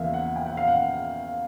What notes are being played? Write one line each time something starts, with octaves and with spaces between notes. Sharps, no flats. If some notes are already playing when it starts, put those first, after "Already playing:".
Already playing: E2 C#3 F3 A#3 E5 F5
F#5
G5
F#5
F5
F#5